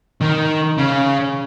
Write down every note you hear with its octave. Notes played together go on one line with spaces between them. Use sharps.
D#3
C#3